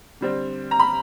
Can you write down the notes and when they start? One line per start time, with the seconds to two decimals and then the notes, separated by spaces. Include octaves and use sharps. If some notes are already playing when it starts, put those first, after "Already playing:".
0.21 D3 G3 C4
0.71 A#5
0.79 B5